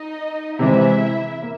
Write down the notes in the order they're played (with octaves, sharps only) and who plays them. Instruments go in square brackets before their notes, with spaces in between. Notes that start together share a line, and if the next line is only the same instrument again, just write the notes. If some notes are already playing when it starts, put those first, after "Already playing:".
Already playing: [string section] D#4 D#5
[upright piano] C3 E3 G#3 C4 [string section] E4 E5
[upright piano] A#3